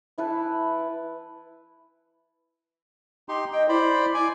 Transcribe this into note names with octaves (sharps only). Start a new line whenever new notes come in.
E3 E4 B4 A5
D#4 G4 C6
D#5 G5
E4 C5 D5 B5
D5 G#5